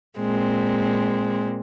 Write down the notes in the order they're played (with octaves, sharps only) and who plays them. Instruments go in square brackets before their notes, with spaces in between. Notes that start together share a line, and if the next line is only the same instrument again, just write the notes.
[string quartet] A#2 G#3 C4